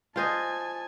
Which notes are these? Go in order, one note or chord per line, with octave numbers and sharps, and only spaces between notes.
F4 C5 D#5 G#5 A5